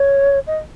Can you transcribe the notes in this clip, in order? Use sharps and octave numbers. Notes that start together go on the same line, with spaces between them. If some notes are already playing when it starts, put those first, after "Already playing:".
Already playing: C#5
D#5